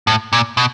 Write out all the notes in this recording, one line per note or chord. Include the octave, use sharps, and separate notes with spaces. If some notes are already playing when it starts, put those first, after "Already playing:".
A2
A#2
B2